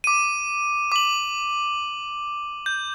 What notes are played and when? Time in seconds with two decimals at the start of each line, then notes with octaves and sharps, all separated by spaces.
0.04 D6 D#7
0.92 D6 F#7
2.66 G6